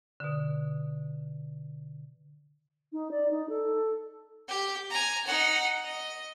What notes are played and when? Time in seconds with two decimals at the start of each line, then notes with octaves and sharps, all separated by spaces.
0.20 B2 D3
2.92 D#4
3.11 D5
3.31 D#4
3.49 A4
4.48 G4 G5
4.90 G#5 A#5
5.26 D#4 F#5
5.84 D#5